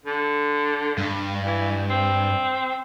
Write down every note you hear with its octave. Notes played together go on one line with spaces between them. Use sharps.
D3
G2
E3
C4